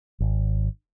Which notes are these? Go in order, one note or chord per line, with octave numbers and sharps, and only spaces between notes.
G#1